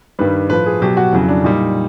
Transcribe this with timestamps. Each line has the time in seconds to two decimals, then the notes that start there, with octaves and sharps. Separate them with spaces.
0.19 G2 D#3 G3 B4
0.50 A2 F3 B4
0.66 G#4
0.82 B2 F#3 G4
0.97 F#4
1.13 F2 C#3 F#3 E4
1.28 D4
1.44 A#2 G3 D#4